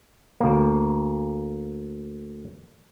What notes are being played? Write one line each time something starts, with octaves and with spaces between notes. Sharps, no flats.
D2 A#3